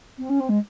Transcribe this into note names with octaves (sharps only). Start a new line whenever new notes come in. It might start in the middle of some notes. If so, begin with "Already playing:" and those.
C4
C#4
C4
G#3